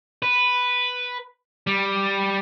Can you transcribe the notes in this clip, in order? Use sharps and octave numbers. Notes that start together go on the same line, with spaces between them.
B4
G3